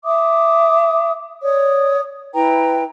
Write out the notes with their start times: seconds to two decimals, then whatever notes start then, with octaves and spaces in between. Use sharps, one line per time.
0.04 E5 D6 D#6
1.43 C#5 D5 D#6
2.34 E4 B4 G5 A#5